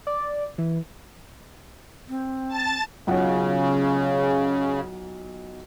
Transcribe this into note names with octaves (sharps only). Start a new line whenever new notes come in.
D5
E3
C4
A5 A6
B1 C#3 F4 F#5